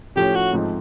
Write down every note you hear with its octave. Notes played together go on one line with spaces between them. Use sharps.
A2 F3 A3 C#4 G4
F#4
G#2 F3 A3 C4 D#4